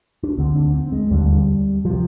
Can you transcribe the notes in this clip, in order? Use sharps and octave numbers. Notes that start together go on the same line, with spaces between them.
D4
D2 D3 C4
D4
C4
G#3
D#2 D3 G3
C3 F3